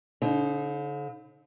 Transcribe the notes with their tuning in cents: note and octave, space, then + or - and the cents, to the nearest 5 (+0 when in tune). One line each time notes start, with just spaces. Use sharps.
D3 -40 D#4 +0 C5 +45